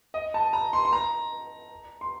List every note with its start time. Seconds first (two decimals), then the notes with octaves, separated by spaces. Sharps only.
0.14 D#5
0.34 A5
0.53 A#5
0.73 C6
0.85 C6
0.92 A#5
2.01 C6